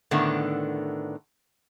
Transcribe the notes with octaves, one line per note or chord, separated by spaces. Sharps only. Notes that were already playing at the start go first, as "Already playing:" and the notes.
A2 D3 D#3 B3 D4